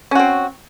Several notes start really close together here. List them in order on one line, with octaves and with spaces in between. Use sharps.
C#4 F#4 C4